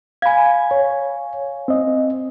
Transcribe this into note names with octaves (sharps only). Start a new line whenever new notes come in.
F5 G#5 B5 G#6
C#5
C4 D#5